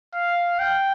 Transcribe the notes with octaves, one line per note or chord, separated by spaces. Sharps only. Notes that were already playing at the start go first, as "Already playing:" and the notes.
F5
G5